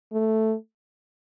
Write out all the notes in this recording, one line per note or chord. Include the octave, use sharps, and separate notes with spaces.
A3